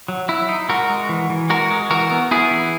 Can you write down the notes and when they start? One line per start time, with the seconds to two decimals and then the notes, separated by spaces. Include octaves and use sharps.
0.08 F#3
0.28 F#3 E4
0.49 D#4
0.69 G#3 F#4 A#4
0.90 G#3
1.09 E3
1.30 E3
1.50 G#3 F#4 A#4
1.71 G#3
1.90 E3 F#4 A#4
2.11 B3
2.31 B3 E4 G#4
2.51 E3